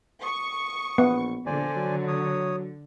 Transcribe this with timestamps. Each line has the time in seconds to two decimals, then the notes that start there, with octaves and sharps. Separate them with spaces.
0.23 C#6 D#6
0.98 A#1 B3
1.46 A#1 D3 C5 D5 G#5
1.77 F#3
2.08 C#5 D#6